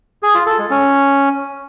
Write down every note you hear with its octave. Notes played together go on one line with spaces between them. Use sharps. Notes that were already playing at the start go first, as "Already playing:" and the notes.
G#4
F4
A4
G#3
C#4